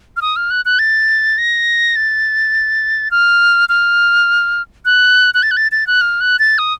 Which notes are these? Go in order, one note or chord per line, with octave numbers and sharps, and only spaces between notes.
F6
D#6
F6
F#6
F#6
A6
A#6
A6
F6
F6
F#6
F#6
A6
F#6
A6
A6
F#6
F6
F#6
A6
D#6